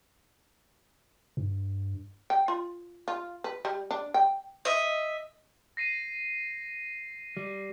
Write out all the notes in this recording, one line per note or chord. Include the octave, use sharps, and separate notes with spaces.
G2
G5
F4
F4
B4
G3
D4
G5
D#5 E5
A#6 C7 D#7
G3